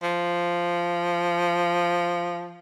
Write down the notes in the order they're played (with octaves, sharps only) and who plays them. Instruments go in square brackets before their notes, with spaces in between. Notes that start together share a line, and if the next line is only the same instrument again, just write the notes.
[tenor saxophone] F3